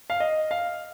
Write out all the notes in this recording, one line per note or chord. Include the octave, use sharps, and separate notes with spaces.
F5
D#5
F5